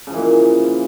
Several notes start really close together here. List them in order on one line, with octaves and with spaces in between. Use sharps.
C#3 F3 E3 A#2